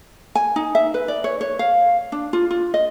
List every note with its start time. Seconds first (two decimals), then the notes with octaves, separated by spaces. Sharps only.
0.35 G#5
0.56 D#4
0.75 E5
0.94 B4
1.08 D5
1.24 C#5
1.41 C#5
1.59 F5
2.12 D4
2.33 F4
2.51 F4
2.74 D#5